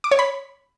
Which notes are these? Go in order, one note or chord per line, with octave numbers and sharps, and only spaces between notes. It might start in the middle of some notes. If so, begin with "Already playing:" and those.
D6
C#5
B5